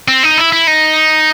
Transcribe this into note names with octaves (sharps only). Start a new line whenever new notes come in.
C4
D#4
E4
E4
D#4